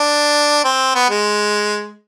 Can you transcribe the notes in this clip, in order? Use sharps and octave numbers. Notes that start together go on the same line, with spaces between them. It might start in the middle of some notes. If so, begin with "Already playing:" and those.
Already playing: D4
C4
B3
G#3